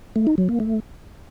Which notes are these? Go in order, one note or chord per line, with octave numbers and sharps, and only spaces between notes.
A3
D#4
F#3
A#3
A3